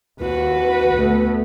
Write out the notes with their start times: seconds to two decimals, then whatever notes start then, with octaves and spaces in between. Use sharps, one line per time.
0.21 D#2 F#4 B4
0.96 D2 A3 B3